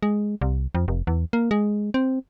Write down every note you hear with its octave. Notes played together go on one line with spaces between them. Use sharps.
G#3
C2
F2
F1
E2
A#3
G#3
C4